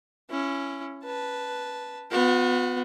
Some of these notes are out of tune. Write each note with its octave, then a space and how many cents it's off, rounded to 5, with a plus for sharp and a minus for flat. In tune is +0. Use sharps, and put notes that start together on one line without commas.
C#4 +0 E4 +30
B4 -5 A5 +0
B3 +20 F#4 -45